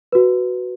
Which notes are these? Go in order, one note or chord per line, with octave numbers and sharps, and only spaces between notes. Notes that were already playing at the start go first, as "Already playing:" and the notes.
F#4 B4